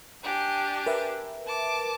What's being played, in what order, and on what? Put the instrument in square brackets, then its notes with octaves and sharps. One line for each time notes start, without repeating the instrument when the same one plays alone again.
[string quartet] D4 G4 G#5
[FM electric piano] A#4 B4 E5
[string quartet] A5 D6